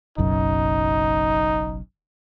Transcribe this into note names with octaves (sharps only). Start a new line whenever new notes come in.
F#1 B1 F#2 D#4